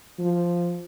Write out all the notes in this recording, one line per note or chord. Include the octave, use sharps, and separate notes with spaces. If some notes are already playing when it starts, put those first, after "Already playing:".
F3